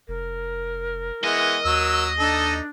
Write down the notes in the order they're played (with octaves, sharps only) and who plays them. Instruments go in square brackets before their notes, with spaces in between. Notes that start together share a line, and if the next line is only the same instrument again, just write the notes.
[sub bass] F1 [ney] A#4
[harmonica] E3 G#3 B3 [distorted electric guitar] D#5
[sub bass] D#2 [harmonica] F#3 E6
[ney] D4 [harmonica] D#4 A4